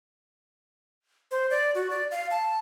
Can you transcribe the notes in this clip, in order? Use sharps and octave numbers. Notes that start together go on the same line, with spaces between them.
C5
D5
F#4
D5
F5
A5